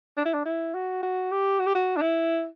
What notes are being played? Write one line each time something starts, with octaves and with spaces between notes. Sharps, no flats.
D4
E4
D4
E4
F#4
F#4
G4
F#4
G4
F#4
D4
E4